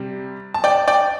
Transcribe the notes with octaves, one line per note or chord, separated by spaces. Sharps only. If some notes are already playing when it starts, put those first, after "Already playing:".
Already playing: C3 G3
A5
D5 G5
D5 G5